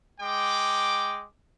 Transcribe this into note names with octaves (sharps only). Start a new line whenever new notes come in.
G#3 G5 D6